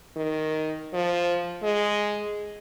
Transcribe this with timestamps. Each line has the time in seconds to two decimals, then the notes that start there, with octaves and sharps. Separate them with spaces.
0.17 D#3
0.93 F3
1.63 G#3